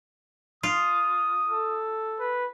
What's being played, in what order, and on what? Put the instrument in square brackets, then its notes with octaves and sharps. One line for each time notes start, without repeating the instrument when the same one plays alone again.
[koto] F4 [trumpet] D#6
[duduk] A4
[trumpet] B4